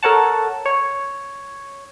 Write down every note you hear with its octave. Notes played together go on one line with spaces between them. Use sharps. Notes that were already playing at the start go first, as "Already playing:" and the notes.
A4 A#4 C#5 F#5 A5
C#5